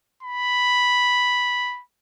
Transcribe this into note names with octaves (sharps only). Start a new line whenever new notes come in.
B5